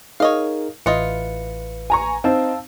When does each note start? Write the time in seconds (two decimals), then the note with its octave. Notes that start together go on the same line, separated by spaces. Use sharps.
0.20 D#4 G#4 A#4 C#5 D#5 F5
0.86 A1 E4 F4 B4 D#5 C#7
1.90 G#5 A#5 C#6
2.24 C4 D#4 F5 A5 E6